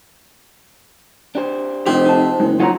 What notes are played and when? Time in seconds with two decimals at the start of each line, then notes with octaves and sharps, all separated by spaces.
1.35 D4 G4 C5
1.87 F1 C4 G4 C5 D#5
2.06 D#4 A5
2.40 F#1 G#3
2.60 F#3 D#4 F4 C#5 F#5 A#5